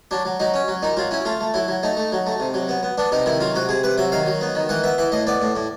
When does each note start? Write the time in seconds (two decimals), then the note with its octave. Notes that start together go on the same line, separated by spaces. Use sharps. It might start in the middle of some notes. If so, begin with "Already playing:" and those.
0.11 F#3 D4
0.25 F#3
0.40 F#3 D#4
0.54 C#4
0.68 F#3
0.82 A#2 D#4
0.97 F#3 F4
1.11 C#4 E4
1.25 A3 F4
1.41 A3
1.54 F#3 E4
1.68 F#3
1.83 A3 D#4
1.97 A3
2.12 F#3
2.27 A3
2.40 C3
2.54 F#3
2.69 B3
2.83 B3
2.98 B3 D4
3.12 C3 D#4
3.26 D#3 E4
3.40 F#3 F4
3.55 C3 F#4
3.69 C3 G#4
3.84 C3 B4
3.98 F#3 E5
4.12 D#3 F5
4.27 F#3
4.41 B3
4.55 D#3
4.69 E3 F#5
4.83 B3 E5
4.98 E3 E5
5.12 A2 D#5
5.27 B3 D5
5.42 A2
5.55 A2